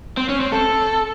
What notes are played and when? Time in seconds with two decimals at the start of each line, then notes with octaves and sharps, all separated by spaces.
0.17 C4
0.29 C#4
0.40 C4
0.52 A4